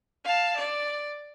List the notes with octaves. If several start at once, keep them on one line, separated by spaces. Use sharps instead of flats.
F5 A5
D5